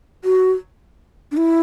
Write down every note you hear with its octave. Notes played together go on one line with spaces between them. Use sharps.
F#4
D4
E4